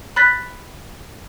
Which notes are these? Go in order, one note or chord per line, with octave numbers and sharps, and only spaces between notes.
B5 F#6 A6 B6